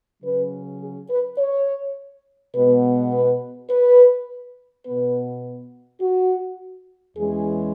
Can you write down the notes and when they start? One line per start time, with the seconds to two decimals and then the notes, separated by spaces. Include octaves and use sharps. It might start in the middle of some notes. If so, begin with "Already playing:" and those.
0.23 C#3 F#3 C#4 B4
0.81 G#4
1.10 B4
1.38 C#5
2.55 B2 G#3 B3 B4
3.13 B4
3.70 B4
4.85 B2 B3 B4
6.01 F#4
7.17 E2 E3 G#3 C#4 G#4